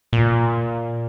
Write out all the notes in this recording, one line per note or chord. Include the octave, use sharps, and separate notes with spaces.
A#2